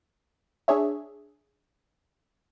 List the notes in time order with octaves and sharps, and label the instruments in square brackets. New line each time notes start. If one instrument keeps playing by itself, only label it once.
[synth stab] D4 G#4 C#5 E5